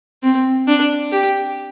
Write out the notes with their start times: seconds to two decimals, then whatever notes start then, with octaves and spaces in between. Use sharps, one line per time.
0.23 C4
0.68 D4
1.12 G4